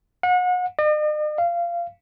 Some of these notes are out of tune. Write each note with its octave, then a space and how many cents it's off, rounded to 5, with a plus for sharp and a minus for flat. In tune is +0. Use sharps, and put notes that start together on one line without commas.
F#5 -35
D#5 -45
F5 -20